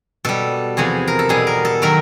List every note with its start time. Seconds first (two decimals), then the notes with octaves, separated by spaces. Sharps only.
0.25 B2 G3 A4
0.77 E2 C3 F3 G#4
1.07 A#4
1.19 A4
1.29 B2 G3 G#4
1.47 A#4
1.65 A4
1.82 D#3 F#3 A#4